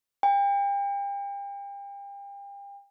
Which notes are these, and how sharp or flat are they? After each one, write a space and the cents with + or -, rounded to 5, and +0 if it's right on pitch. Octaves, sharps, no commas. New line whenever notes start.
G5 +35